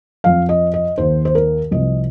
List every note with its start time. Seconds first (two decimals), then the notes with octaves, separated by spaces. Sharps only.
0.24 F2 F3 F5
0.49 D#5
0.74 D#5
0.98 D#2 D#3 C5
1.25 C5
1.35 A#4
1.71 C2 C3 F3 D#5